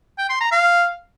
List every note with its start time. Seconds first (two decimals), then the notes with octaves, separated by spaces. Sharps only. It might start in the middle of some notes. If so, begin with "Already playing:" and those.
0.18 G5
0.30 C6
0.41 A#5
0.52 F5